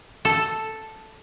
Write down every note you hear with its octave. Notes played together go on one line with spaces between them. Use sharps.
A4